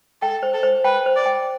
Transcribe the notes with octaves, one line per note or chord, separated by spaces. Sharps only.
A4 G5
C5
A4
C5
B4 G5
C5
D5
G5